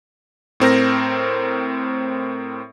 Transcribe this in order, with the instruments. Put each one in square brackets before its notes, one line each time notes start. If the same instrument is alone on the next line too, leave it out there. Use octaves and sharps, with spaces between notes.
[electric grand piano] A2 C4 A#4 A#6